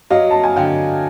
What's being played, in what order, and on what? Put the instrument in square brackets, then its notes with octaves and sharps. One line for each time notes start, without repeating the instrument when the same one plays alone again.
[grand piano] F#3 [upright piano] D#5 F5
[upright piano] A5
G#5
[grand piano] D3 [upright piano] F5 G5